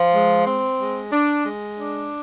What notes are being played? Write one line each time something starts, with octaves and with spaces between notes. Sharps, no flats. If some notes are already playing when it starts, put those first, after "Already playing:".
Already playing: F3
G#3
C4
G#3
D4
G#3
D4